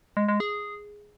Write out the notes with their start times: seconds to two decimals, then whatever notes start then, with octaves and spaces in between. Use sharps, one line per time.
0.17 G#3
0.28 G#3
0.40 G#4